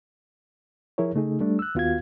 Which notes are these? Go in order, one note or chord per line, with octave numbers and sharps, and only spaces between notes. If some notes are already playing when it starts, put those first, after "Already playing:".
F3 E4 G#4 A#4 C#5
C#3 A3 D#4 G#4
G3 A3 D4
E6 F#6
D#2 B3 F4 F#4 F5 G#6